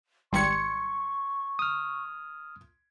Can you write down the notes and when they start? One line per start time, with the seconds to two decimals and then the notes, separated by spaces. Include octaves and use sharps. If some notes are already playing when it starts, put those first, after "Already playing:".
0.33 G#1 G3 C6 C#6 G#6 C#7
1.59 D#6 F6